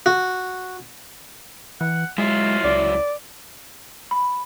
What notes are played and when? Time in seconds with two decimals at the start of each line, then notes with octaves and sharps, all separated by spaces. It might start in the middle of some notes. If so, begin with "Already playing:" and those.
0.06 F#4
1.81 E3 F#5
2.18 F#3 G#3 E4 F4
2.64 C#2 D5
4.11 B5